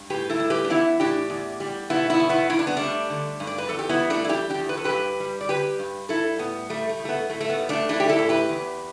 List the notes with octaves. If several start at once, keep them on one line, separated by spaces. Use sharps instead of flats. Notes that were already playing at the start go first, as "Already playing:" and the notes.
Already playing: G2
A2 G4 B4
E4 A4
G3
G4 B4
D4
E3 B3 E4
A2 D4 G4
E2
G3
B2 B3 E4
B3 E4
E2
B3 E4
G2 E4
D4
B3
G3 A3 D4
D3
G2
D5
B4
E2 A4
G4
B3 E4
G3
A3 D4
E4
E3 D4 G4
D4 G4
E2
B4
A4
G2 G4 B4
G3
D5
D3 G4 B4
G2
G3 E4 A4
A2 B3
G3 A3
A3
A2
A3
B3
A2 A3
A3
B3
G3
A3 D4
E3 A3 D4
G4
E4 A4
A2
G4 B4
E2